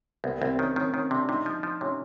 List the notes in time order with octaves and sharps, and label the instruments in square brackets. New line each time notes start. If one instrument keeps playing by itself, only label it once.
[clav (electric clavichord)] C2 [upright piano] B3
[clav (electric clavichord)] C2 [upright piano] C4
[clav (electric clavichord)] D#3 [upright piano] C#4
[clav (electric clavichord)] D#3 [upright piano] C#4
[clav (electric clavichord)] D#3 [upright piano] C#4
[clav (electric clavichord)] C3 [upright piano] D4
[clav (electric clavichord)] C3 [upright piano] D#4
[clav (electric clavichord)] F3
F3
[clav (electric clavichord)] C3 [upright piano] C#4